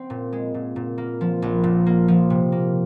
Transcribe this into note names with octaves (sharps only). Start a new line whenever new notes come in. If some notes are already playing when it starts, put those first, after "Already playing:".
Already playing: C4
A#2
G#3
A#2
A#2
A#3
F3
A#1
A#2
A#3
F3
C3
A#3